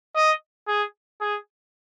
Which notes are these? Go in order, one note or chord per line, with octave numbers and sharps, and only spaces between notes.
D#5
G#4
G#4